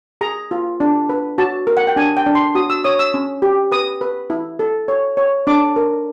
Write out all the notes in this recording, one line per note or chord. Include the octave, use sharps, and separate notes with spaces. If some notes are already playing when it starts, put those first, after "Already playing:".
G#4 A#5
F4
D4
B4
F#4 A5
A#4
F#5
G5
D4 G#5
G5
D4
C6
F#4 D#6
E6
C#5 D#6
E6
C#4
G4
B4 D#6
B4
E4
A4
C#5
C#5
D4 D6
A#4